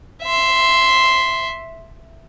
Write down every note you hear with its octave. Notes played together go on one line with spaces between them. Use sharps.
E5 C6